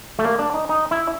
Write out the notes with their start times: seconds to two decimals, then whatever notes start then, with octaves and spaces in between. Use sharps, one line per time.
0.19 A3
0.25 A#3
0.39 D4
0.54 D#4
0.69 D#4
0.91 E4